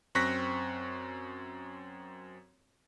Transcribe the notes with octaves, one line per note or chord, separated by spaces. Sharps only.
F#2 C4 C#6 F#6 A#6 B6